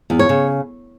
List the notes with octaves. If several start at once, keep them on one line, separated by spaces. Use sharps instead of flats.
E2
C#5
C#3